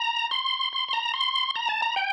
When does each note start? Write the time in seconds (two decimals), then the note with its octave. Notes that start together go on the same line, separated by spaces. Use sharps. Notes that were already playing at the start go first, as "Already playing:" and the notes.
Already playing: A#5
0.31 C6
0.73 C6
0.88 C6
0.93 A#5
1.14 C6
1.56 A#5
1.69 A5
1.82 A#5
1.96 G5